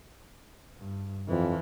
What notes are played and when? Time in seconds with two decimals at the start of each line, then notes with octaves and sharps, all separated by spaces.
0.79 G2
1.28 F2 E3 F3